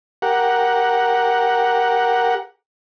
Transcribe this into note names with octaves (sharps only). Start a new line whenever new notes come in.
G4 A#4 F#5